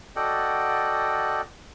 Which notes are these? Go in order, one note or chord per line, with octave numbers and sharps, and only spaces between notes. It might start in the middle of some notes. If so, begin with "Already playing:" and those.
F#4 A4 D5 D#5 F#5 G5